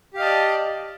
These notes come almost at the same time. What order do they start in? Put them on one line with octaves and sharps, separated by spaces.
G4 F5 D#5 A5 D5